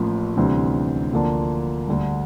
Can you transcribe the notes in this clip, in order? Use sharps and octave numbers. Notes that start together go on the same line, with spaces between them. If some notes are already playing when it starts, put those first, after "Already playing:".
Already playing: A1 A2 F3 A#3
D2 C3 E3 G3 C4
D2 D3 F3 A#3 D4
D2 D3 G3